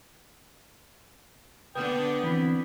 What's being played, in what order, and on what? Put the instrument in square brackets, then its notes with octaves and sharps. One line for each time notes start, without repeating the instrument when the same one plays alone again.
[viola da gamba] D3 B3 D4 [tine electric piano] B4 [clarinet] G5 [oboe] D#6
[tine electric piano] E3 C4 [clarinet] E4 [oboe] B5